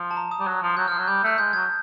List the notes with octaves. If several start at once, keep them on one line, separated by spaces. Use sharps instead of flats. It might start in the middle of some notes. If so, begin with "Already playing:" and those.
Already playing: F3
A5
A#5
D#6
G3
F#3
F3
F#3 G6
F3 F6
F#6
F#3
G3 G6
A3 F#6
G#3 G6
F#3 G#6